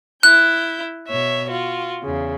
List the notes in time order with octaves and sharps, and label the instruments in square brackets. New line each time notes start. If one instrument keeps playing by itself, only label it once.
[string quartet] E4 G6 [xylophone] F#6
[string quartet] B2 C#5 E5
F4 F#4
E2 C#3